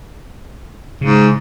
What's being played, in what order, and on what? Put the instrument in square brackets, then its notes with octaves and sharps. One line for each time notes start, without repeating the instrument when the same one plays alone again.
[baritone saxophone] G#2 [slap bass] C#3